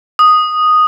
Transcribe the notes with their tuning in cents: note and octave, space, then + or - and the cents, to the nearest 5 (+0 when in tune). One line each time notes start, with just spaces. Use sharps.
D#6 -5